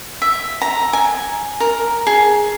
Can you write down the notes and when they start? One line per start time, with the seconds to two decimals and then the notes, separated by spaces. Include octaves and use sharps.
0.22 E5
0.62 A#5
0.93 G#5
1.60 A#4
2.07 G#4